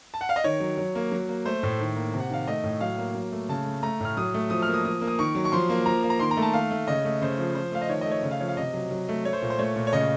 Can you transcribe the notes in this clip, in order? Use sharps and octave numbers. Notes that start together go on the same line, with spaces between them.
A5
F#5
F5
D#5
D#3 C#5
F#3
F#3
A#3
F#3
A#3
A3 C5
A2
D#3
A#3
C3
F#5
D#3 F5
A3 D#5
A2
F#3 F5
A#3
F#3
A3
C#3 A5
A3
A3 A#5
A2 F6
F#3 D#6
A3
F3 D#6
F6
A#3
D#6
F3 D#6
A#3
D#6
D#3 C#6
F#3
C#6
F3 C6
A#3
F3 A#5
A#3
A#5
D#3 C6
A#5
A3
A5
D#3 F5
A3
C#3 D#5
A3
C#3 C5
F3
F3 C5
A3 F5
D#5
D#3 C#5
D#5
A3
C#5
C#3 D#5
F5
F3 C#5
F5
C3 D#5
F#3
F#3
A3
A3 C#5
C5
A#2
C5
A3 C#5
A#2
C#5
C#3 D#5